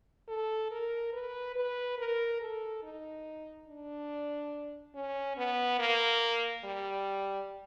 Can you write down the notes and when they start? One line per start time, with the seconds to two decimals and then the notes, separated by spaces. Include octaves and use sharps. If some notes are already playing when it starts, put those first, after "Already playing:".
0.28 A4
0.71 A#4
1.13 B4
1.56 B4
1.98 A#4
2.41 A4
2.83 D#4
3.68 D4
4.95 C#4
5.37 B3
5.79 A#3
6.64 G3